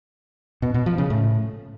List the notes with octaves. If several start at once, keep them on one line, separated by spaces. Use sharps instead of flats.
B2
B2
F3
C#3
A2